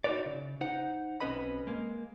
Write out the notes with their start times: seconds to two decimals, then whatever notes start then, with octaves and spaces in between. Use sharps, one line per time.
0.04 D#4 E4 F#4 B4 C#5 D5
0.26 C#3
0.61 D#4 C5 F#5
1.20 B1 C4 C#4 B4 D#5 B5
1.67 G#3 A#3